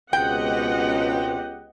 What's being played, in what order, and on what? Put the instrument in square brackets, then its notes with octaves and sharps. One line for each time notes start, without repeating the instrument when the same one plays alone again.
[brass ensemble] C#2 G4 [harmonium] B2 C4 [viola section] B3 D#5 F#5 [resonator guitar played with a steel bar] G5